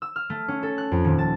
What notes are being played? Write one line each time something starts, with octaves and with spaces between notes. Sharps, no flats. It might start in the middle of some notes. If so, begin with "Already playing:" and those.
E6
F6
A3
C#4
A4
F#6
F2
D#1
A5